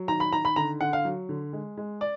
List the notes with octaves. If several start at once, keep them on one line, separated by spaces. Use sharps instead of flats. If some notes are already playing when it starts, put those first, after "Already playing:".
Already playing: F#3
D#3 A#5
B5
D#3 A#5
B5
D3 A#5
D3 F#5
F5
F#3
D3
G#3
G#3
D5